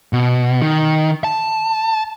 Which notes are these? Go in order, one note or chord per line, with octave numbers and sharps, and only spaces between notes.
B2
D#3
A5